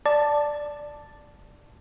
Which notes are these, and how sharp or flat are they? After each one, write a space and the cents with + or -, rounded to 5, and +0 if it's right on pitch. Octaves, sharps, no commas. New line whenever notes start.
D5 +0 A5 +0